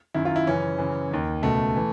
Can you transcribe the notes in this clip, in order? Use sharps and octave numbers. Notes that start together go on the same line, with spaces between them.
F#2 D#3 E4
F4
E4
F#2 C#3 E3 C#4
F#2 C#3 E3
D#2 D#3
C#2 B2 A3
E3